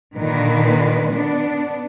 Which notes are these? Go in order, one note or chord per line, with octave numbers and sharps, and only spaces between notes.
A#2 D3 D#3 B4
B3 D4